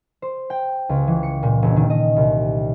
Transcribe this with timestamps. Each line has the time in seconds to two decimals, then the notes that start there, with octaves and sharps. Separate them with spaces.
0.22 C5
0.50 G5
0.89 C#2
1.07 E3
1.23 C#7
1.43 A#2
1.62 E1
1.76 D#3
1.90 D#5
2.16 C2